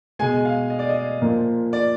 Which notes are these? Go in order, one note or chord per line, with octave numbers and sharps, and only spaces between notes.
B2 G#3 G#5
F5
D#5
D5
D#5
A#2 F3 A#3
D5